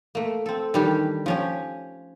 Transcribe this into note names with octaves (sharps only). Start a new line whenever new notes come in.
A3 A#3
C4 A4
D#3 E3 G3 D4 G4
F3 C#4 G4